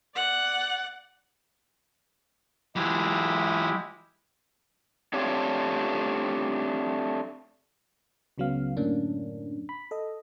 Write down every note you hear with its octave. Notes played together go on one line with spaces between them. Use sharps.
D5 F#5
E3 F#3 G#3 E4 G4
A3 C4 D4 F4 G4 C#5
C#2 C#3 F#3 B3 F5
F#2 A2 D3 A#3 C#4 D4
B5
A4 D#5